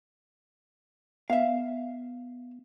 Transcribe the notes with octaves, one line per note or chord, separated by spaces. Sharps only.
B3 E5 F5